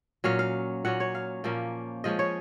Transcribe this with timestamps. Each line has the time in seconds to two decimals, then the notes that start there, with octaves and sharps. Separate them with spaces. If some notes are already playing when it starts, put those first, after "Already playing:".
0.24 A#2 F#3 C#4 F5
0.39 F5
0.85 A#2 F#3 C#4 F#5
1.00 C#5
1.15 F5
1.44 A#2 F3 A#3 C#4
2.04 F3 G#3 C#4 D#5
2.19 C#5